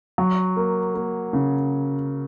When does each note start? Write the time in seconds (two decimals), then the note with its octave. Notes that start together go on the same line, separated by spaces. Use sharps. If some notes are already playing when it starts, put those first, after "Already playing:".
0.18 F#3
0.56 A#3
0.95 A#3
1.33 C#3